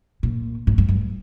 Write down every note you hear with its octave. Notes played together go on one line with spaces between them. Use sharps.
A#2
G#2
G2
G2